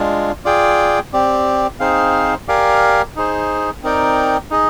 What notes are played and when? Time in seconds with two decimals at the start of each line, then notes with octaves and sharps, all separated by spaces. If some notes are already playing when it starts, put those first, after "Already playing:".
Already playing: G#3 D4 F4
0.45 F4 G#4 D5 G5
1.13 C4 G4 D5
1.80 C4 D#4 G#4 C5 F5
2.48 G4 A#4 D5 F5 G#5
3.16 D#4 G#4 C5
3.83 C4 D#4 A#4 D5 G5
4.50 D#4 G#4 D#5